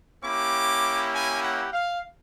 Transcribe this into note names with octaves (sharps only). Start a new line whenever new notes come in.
A#3 C#4 E4 G4 D6
G#5
F#5
F5